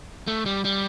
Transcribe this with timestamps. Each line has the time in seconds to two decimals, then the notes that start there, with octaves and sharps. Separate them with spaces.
0.27 A3
0.46 G3
0.65 G3